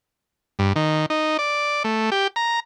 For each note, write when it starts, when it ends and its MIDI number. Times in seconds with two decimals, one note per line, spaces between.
0.59 0.73 43
0.76 1.06 51
1.10 1.37 63
1.39 1.83 74
1.84 2.10 57
2.12 2.27 67
2.36 2.60 82